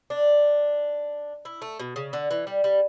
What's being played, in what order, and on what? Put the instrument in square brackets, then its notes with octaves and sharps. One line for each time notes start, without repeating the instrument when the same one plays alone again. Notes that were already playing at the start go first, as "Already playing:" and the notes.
[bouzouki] D4
E4
A3
B2
C#3
D3
E3
G3
G3